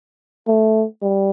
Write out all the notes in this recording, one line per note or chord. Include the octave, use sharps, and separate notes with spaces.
A3
G3